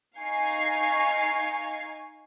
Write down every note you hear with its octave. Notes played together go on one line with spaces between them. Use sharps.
D#4 F5 G#5 C#6 C7